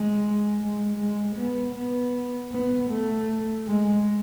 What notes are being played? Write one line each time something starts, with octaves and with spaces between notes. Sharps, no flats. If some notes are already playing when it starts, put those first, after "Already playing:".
Already playing: G#3
G#3
G#3
B3
B3
B3
A3
G#3